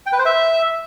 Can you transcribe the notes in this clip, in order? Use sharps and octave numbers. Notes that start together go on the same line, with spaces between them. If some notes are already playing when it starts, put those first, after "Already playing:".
G5
B4
C5
E5